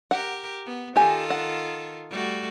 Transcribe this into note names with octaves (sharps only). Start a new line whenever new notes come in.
G4 A#4 F#5
B3
D#3 F4 G4 A4 G#5
F#5
G3 A3 F#4